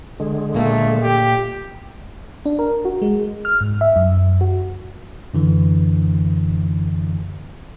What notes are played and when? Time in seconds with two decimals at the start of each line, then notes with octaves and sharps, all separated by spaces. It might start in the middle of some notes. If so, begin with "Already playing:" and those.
0.20 D3 G#3
0.54 A#2 A3 A#3
1.02 G4
2.46 D4
2.59 A#4
2.85 F#4
3.02 G#3
3.45 F6
3.61 G#2
3.81 E5
3.96 F#2
4.41 F#4
5.34 F#2 D3 E3